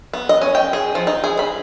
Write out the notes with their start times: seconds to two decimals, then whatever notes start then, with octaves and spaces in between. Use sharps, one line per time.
0.13 B3
0.29 D#5
0.42 C#4
0.55 G5
0.73 G#4
0.95 F3
1.07 D#4
1.24 G#4
1.39 B5